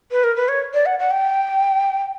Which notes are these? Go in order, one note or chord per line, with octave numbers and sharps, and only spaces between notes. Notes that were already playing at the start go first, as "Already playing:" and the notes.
B4
A#4
B4
C#5
D5
F#5
F#5
G5